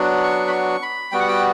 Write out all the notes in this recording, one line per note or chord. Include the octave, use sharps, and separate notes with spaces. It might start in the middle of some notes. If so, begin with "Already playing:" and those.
Already playing: F#3 B3 D4 F#4
C#6
B5
C#6
B5
G3 B3 F#4 G5
F#5
G5